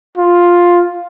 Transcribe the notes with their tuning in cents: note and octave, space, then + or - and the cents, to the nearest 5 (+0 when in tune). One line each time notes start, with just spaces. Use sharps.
F4 +5